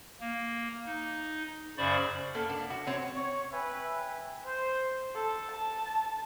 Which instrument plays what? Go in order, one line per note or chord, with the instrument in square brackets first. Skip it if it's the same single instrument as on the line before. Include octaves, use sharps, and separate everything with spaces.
[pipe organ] A#3
D#4
F#2 C#3 C5 D5 B5 C#6
[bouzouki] A#3 B3 A4
D4
F#4
C4 C#5
[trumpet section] C#5
B4 E5 G5 G#5
[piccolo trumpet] C5
[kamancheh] A4
A5